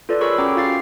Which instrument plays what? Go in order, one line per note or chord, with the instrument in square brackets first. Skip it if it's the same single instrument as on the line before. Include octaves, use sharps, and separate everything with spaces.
[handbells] F4 A4 B4 D5
G#4 A#4 C#5 B5 C#6 E6
C#4 F#4 G5 A#5 D6
F4 F5 A6 C7